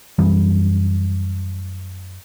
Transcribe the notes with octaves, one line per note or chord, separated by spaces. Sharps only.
F#2 E3 G3